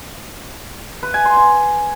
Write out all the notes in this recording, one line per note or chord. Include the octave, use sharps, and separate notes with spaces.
B4
G#5
C6
G#5